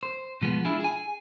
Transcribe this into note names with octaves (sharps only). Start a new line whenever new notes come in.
C5
B2 F3 G#3 B3
D4 E4 F4 G#4
G#4 G#5